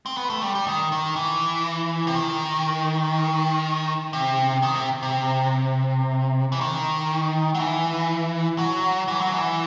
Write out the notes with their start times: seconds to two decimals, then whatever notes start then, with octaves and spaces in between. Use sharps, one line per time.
0.06 C4
0.17 B3
0.30 A3
0.42 G3
0.55 G3
0.67 D#3
0.92 D#3
1.16 E3
2.07 C3
2.15 D#3
4.13 C3
4.62 D#3
4.75 C3
5.03 C3
6.52 E3
6.61 D#3
7.55 F#3
7.59 E3
8.58 F#3
9.08 E3
9.20 F#3
9.33 E3